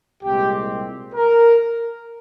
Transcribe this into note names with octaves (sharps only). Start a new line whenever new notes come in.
C2 A#2 G#3 C4 G4
A#4